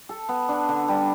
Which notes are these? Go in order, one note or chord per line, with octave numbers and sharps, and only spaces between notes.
A4
B3
D4
D3
G3